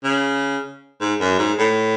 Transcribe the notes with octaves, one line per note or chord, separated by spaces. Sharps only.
C#3
G#2
F#2
G#2
A2